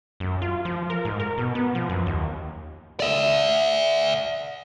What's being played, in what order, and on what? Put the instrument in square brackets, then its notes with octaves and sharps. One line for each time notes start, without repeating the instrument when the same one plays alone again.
[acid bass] F#2
F4
F3
A#4
G#2
A#4
B2
B3
F3
F#2
D#2
[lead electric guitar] D5 E5